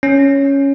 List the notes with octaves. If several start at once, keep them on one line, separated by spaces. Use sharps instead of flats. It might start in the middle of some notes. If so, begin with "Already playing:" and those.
C#4